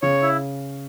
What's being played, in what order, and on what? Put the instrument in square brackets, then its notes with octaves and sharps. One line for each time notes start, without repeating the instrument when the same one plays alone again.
[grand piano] C#3 [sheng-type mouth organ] C#5
[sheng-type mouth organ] E4